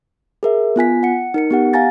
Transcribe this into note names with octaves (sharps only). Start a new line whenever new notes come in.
G#4 A#4 E5
B3 F4 G#5 B6
F#5 C#7
D#4 A#4 C#7
B3 G4 F#5
F5 F#5 G#5 A#5 A6 A#6